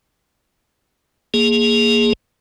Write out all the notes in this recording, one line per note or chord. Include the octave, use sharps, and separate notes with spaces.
A#3 G#4